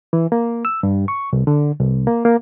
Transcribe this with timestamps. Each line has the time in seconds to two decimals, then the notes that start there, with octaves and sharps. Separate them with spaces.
0.13 E3
0.32 A#3
0.65 E6
0.83 G2
1.08 C#6
1.33 C2
1.47 D3
1.80 C2
2.07 A#3
2.25 A#3